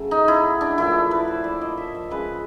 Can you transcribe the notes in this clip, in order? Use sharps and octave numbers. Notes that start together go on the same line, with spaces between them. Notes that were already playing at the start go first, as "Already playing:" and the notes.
Already playing: C#3 F#3 A3
D#4
E4
D4
A#2 F3 A3 E4
B4
C5
D5
D#5
E5
F5
C#3 F3 G#3 B4